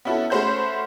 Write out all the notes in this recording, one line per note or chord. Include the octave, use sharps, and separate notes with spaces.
B3 C#4 E4 F#4 A4
A3 C#4 F#4 C5 B5 G6